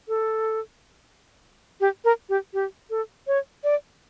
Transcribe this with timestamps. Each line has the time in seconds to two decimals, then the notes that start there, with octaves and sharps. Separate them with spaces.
0.08 A4
1.81 G4
2.05 A#4
2.29 G4
2.54 G4
2.90 A4
3.27 C#5
3.64 D5